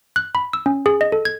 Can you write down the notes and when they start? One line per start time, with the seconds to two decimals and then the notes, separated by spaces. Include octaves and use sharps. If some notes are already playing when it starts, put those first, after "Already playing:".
0.16 F#6
0.35 B5
0.53 E6
0.66 C#4
0.86 G#4
1.01 D#5
1.12 A4
1.25 G#6